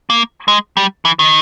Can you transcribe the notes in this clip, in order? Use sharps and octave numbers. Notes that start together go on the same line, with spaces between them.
A#3
G#3
G3
E3
D#3